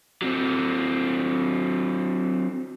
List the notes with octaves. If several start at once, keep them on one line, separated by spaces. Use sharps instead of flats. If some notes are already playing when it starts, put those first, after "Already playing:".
F#3 C4